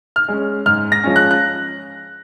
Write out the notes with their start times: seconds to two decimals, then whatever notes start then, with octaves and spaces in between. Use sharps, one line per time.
0.16 F6
0.28 G#3 C#4
0.66 G#2 F6
0.92 A#6
1.04 F3 G#3 C#4
1.16 F#6
1.31 F#6